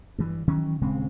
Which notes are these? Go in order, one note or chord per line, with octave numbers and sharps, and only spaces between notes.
G2 E3
D#3 E3 F#3 C#4
D#1 C#3 G#3 C4